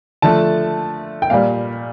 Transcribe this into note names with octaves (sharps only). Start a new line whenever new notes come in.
D3 F3 A3 A5
G5
A#2 G3 F5